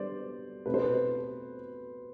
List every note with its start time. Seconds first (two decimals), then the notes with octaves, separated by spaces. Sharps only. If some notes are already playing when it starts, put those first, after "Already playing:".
Already playing: D3 G3 B3 C5 D5
0.66 B2 A3 C4 B4
0.74 C5
0.82 B4